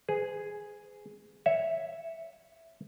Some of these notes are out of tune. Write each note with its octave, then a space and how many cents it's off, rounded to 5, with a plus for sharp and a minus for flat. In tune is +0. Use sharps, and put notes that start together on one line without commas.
G#4 +0 B4 +45
C#5 +0 E5 +0